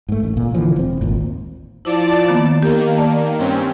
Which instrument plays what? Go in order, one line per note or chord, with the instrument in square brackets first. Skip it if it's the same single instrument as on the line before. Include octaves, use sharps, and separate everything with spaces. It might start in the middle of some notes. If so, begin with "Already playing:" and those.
[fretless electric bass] G#2 A3
A1
A#2
D3 E3 F3
E1 C4
G#1 D#2 A#2
[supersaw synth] F3 D5 A5 [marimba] E4
[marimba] D#3 A#3 B3
[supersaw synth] D#3 A#3 [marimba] G4
[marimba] D5 A5
[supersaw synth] G2 C4 C#4